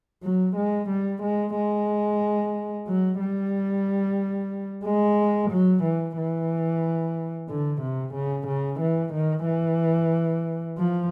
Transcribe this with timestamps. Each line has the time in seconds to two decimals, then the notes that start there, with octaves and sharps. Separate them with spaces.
0.23 F#3
0.56 G#3
0.89 G3
1.22 G#3
1.55 G#3
2.87 F#3
3.20 G3
4.85 G#3
5.51 F#3
5.83 E3
6.17 E3
7.49 D3
7.81 C3
8.14 C#3
8.47 C#3
8.80 E3
9.13 D#3
9.46 E3
10.78 F3